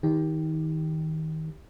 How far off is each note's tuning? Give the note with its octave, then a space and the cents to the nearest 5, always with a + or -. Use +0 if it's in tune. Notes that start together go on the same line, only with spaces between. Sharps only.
D#3 +25 G4 +0